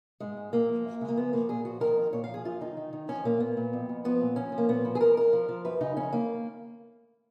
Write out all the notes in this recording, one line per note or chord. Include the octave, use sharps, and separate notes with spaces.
G#2 G#3
G#2
A#2 A#3
F3
F#2
C#3 G#3
A#3
F3 B3
F3 A#3
A#2 G#4
F3 F#4
D#3 A#4
F2
A#2 C#5
F3 F5
G#4
F#2 F4
D#3 D#4
D#3
D#3
F3 C#4
A#2 A#3
A#2 B3
A#2
F2
F2
F3 B3
A#2
F3 C#4
F3
A#3
A#2 B3
F3
G#4
F3 A#4
F2 A#4
F3
F3
F#2 B4
C#3 D#4
F2 C#4
D#3 A#3